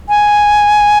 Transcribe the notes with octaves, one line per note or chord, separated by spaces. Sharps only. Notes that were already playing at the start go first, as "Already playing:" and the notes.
G#5